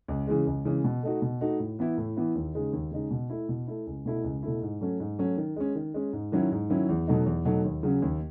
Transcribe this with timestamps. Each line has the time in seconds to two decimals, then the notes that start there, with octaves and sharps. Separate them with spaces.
0.08 C#2
0.27 C#3 E3 G#3
0.47 C#2
0.65 C#3 E3 G#3
0.84 B2
1.03 A3 D#4 F#4
1.22 B2
1.41 A3 D#4 F#4
1.60 A2
1.79 E3 B3 E4
1.98 A2
2.16 E3 B3 E4
2.35 D#2
2.55 C#3 G#3 D#4
2.73 D#2
2.92 C#3 G#3 D#4
3.11 B2
3.30 A3 E4
3.49 B2
3.67 A3 E4
3.87 C#2
4.06 B2 A3 E4
4.24 C#2
4.43 B2 A3 E4
4.62 G#2
4.81 F#3 A3 C#4
5.00 G#2
5.18 F#3 A3 C#4
5.37 D#3
5.56 G#3 C#4
5.75 D#3
5.94 G#3 C#4
6.13 G#2
6.32 D#3 F#3 C#4 E4
6.52 G#2
6.70 D#3 F#3 C#4 E4
6.89 E2
7.08 B2 F#3 A3 D#4
7.26 E2
7.45 B2 F#3 A3 D#4
7.64 D#2
7.83 C#3 F#3 C#4
8.02 D#2